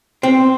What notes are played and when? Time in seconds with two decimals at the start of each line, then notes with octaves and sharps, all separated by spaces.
0.23 C4